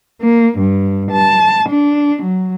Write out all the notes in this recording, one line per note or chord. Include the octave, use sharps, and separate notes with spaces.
A#3
G2
A5
D4
F#3